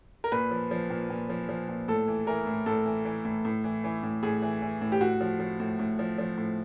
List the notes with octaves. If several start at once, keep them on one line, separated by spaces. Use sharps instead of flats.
A#4
A#2 B4
F3
F3
A#2
A#2
F3
F3
A#2
A2 A4
E3
E3 A#4
A2
A2 A4
E3
E3
A2
A2
E3
E3
A2
A2 G#4
E3
E3
A2
G4
A2 F#4
F3
F3
A2
A2
F3
F3
A2